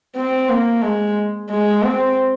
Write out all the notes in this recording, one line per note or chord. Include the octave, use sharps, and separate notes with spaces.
C4
A#3
G#3
G#3
C4